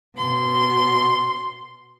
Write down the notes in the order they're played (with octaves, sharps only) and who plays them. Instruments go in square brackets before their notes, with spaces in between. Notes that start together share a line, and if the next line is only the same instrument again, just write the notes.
[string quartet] B2 C6